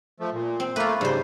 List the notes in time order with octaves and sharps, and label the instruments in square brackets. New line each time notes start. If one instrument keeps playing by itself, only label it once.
[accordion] F3 A3
A#2
[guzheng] C4
[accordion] A3 A#3 [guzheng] F4 B4
[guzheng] G#2 C5 [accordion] C#3 G3